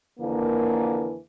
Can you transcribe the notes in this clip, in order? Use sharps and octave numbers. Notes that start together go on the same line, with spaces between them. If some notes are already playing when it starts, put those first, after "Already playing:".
F2 D3 E3 A#3